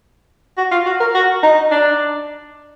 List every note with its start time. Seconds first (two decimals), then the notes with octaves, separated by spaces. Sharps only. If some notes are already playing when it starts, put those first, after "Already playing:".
0.58 F#4
0.71 F4
0.86 F#4
1.00 A#4
1.15 F#4
1.43 D#4
1.71 D4